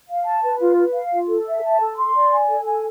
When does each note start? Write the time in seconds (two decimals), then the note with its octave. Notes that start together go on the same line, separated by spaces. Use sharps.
0.08 F5
0.25 A5
0.42 B4
0.59 F4
0.77 B4
0.94 F5
1.11 F4
1.28 A4
1.45 E5
1.63 A5
1.79 A4
1.97 C6
2.14 D5
2.32 G#5
2.48 A4
2.65 G#5